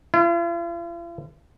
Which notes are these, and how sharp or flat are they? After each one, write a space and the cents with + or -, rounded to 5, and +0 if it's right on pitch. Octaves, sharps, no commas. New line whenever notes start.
F4 -45